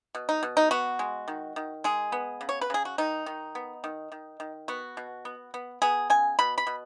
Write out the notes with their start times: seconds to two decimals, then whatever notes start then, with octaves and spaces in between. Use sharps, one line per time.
0.15 B2
0.29 D#4
0.43 B2
0.57 D#4
0.71 B3 F#4
0.99 G#3
1.28 D#3
1.56 D#3
1.84 G#3 G#4
2.12 B3
2.41 C#3
2.49 C#5
2.61 B4
2.70 C#3 G#4
2.85 F#4
2.98 D#3 D#4
3.26 D#3
3.55 B3
3.84 D#3
4.12 D#3
4.40 D#3
4.68 B3 F#4
4.97 B2
5.25 B3
5.54 B3
5.82 B3 G#4
6.10 C#3 G#5
6.39 B2 B5
6.58 B5
6.67 B2